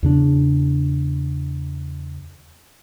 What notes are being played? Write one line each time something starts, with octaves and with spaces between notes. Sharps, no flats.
E2 C#3 D4